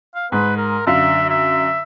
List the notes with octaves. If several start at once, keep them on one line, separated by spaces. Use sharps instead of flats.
F5
G#2 B4
A#4
F#2 D3 E5 F5
E5